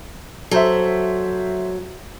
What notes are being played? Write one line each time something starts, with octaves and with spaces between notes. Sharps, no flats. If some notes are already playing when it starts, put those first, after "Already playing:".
F#3 A4 C5 E5